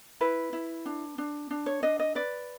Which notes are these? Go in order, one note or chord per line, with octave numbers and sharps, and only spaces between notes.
E4 B4
E4
D4
D4
D4
C#5
D4 D#5
D#5
B4 D5